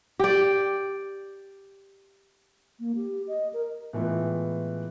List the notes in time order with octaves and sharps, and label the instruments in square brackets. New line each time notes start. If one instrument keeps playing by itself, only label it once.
[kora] G4 D5
[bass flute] A#3
G4
D#5
A#4
[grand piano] A2 E3 G#3 B3 F4